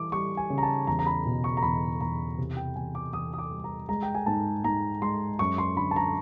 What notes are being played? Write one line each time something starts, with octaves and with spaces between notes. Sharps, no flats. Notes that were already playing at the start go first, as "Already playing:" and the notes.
Already playing: E3 G3 D6
G3 C#6
G#5
C#3
A#5
A5
E2 A#5
A#5
B5
B2
C#6
A#5
E2 B5
E2 A#5
C3
G5
E2 G#5
D6
E2 D#6
D#6
D6
G3
A#5
G#3 A#5
G5
G#5
G#2 A5
G#2 A#5
G#3 C6
F#2 C#6
C6
D3 B5
A5
A#5